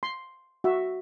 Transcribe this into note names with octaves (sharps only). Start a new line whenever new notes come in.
C6
F#4 E5